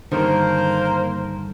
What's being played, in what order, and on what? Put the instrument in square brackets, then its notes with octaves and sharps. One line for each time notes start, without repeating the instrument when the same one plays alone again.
[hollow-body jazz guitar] G2 D3 D#3 [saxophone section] A#3 A#4 C5